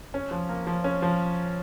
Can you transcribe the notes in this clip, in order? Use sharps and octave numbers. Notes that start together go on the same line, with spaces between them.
C#4
F3
A#3
F3
C#4
F3